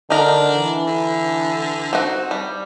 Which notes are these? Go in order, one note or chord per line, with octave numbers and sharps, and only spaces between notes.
D3 D4 D#4 A#4
E3
D3
C4 D#4 F#4
G3